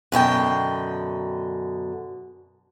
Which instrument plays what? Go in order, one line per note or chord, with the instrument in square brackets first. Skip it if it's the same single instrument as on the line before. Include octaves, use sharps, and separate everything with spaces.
[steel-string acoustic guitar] F#2 B2 D3 G5